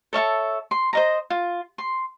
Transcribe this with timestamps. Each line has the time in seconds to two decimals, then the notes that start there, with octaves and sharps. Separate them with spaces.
0.13 A4 C#5 E5 A5
0.71 C6
0.93 C5 D#5 A#5
1.30 F4
1.78 C6